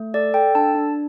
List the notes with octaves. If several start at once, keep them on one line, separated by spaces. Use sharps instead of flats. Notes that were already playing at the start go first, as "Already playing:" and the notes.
Already playing: A3
A4 D5
A4 G5
D4 A5
D4